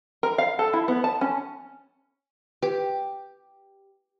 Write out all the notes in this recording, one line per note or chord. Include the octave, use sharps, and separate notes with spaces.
A#4
F5
A4
E4
B3
A5
C#4
G4 B4